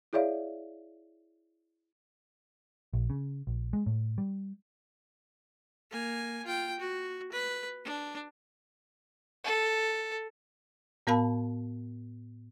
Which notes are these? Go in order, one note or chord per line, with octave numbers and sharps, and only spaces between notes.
E4 G#4 C#5 D5 E5 F5
A#1
C#3
A#1
G#3
A2
G3
A#3 G#5
F4 G5
F#4
B4
D4
A4
A2 B3 A#4 F5 A5 B5